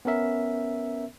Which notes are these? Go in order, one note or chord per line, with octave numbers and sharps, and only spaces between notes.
B3 C#4 A#4 E5